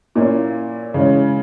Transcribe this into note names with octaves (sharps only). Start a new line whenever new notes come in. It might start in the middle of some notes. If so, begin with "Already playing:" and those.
A#2 A#3 C#4 E4
C#3 E3 G#3 C#4